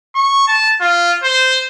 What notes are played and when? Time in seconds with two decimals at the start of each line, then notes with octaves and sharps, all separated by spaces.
0.15 C#6
0.48 A5
0.81 F4
1.23 C5